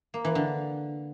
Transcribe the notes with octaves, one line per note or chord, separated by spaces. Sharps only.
A#3
E3
D3